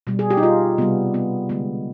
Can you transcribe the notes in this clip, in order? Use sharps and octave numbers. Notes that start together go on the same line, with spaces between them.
B2 G3
G#4
G4
D#4
F4
C3 G3 B3
B3
D3 G#3 B3